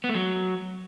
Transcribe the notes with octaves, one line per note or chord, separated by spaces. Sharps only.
B3
A3
F#3